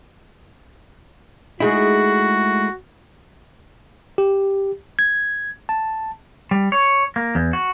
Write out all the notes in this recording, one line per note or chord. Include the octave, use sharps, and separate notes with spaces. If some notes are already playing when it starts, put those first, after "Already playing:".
G#3 A3 D#4 E4 F#4 G#4
G4
G#6
A5
G3
C#5
A#3
E2
F#4